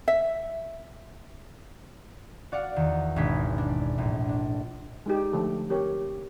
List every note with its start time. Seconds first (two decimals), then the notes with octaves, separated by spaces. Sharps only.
0.08 E5
2.52 F#4 D5 F5 F#5
2.76 E2 D#3
3.16 G#1 B2 G#3 D4 B6
3.58 D4
3.98 A#1 A2
4.29 D4
5.06 G#3 D#4 G4
5.33 D3 F3 A3 A4
5.70 C4 G4 A#4 C#5